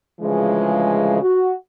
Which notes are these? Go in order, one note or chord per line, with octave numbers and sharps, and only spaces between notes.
D2 C#3 E3 F3 G#3
F#4